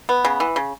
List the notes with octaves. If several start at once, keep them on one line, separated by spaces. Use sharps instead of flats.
B3
C#3
E3
C#3